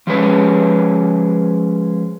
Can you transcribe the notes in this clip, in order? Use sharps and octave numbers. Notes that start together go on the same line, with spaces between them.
F3 G#3 C#4 B4 C#5